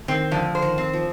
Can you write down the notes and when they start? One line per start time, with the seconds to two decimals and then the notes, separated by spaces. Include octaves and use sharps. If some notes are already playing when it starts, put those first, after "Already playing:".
Already playing: A3
0.08 D#3 C4
0.31 D3 F3
0.55 C5
0.62 D#3
0.78 C4
0.93 F3